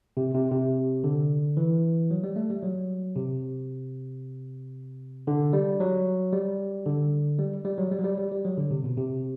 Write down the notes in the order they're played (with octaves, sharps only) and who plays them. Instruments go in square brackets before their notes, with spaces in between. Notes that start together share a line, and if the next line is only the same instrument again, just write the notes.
[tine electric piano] C3
C3
C3
D3
E3
F#3
G3
A3
G3
F#3
C3
D3
G3
F#3
G3
D3
G3
G3
F#3
G3
F#3
G3
G3
G3
F#3
D3
C3
B2
C3